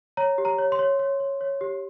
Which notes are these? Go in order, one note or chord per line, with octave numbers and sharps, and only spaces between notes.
C#5 A#5
G4
A#5
C#5
C6
C#5
C#5
C#5
C#5
G4